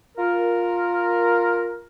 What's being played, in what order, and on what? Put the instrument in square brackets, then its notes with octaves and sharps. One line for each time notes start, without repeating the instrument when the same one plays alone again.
[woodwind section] F4 A#4